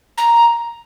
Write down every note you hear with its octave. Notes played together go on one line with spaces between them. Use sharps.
A#5